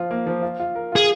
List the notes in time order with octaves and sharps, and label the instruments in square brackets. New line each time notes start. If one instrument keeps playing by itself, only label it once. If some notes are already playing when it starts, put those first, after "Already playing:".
Already playing: [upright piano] F3 F4
A#3
F3
F4
F4
A#4
[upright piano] F4 [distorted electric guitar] G#4